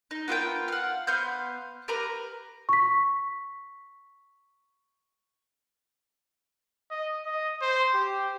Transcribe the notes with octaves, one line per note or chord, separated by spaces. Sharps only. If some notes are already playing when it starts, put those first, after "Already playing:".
D#4
B3 F4 A#4 G5
F5 F#5
B3 C5 F5 G6
G4 A#4 B4 A#5
C#6 B6
D#5
D#5
C5
G4